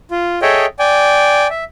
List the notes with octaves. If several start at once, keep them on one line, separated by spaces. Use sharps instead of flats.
F4
G#4 A4 C#5 D#5 E5 G5
D5 G5 G#5
E5